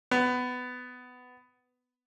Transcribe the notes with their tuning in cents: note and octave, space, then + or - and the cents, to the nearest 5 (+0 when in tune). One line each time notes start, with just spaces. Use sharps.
B3 +15